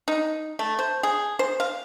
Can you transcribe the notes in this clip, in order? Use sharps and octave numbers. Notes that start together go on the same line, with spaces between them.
D#4
A3
C5
G#4
C5
F5